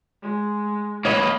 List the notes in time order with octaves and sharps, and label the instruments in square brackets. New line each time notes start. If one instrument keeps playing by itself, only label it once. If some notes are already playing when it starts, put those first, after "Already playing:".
[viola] G#3
[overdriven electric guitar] A#3 B4 [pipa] C#5 [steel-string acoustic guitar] D#5